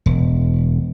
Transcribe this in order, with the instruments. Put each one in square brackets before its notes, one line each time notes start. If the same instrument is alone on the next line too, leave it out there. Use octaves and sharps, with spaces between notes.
[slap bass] E1